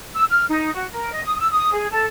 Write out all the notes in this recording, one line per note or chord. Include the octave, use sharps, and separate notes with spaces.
E6
F6
D#4
F#4
A#4
D#5
D#6
E6
D#6
G#4
A4